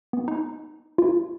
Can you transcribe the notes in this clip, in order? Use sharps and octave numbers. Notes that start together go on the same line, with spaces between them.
B3
D#4
F4